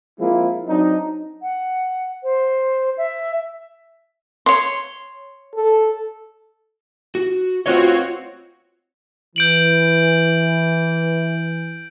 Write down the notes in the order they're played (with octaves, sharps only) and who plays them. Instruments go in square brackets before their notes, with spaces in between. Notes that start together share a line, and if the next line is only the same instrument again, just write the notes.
[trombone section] F3 G#3 A#3 C4 E4 F4
F#3 C4 D4 D#4
[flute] F#5
C5
E5
[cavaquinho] C#5 C6
[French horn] A4
[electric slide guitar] F#4
[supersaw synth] C4 F#4 C#5 [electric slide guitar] F4 B4 D#5
[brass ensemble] E3 [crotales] G6 D7 F#7